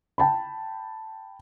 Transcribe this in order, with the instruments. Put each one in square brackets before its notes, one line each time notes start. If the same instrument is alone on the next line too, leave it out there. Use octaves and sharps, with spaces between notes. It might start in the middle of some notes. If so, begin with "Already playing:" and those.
[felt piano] G5 A5 B5